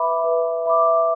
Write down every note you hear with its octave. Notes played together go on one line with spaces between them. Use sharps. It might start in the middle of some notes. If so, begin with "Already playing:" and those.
Already playing: B4 E5 B5 D6
B4
E5 B5 D6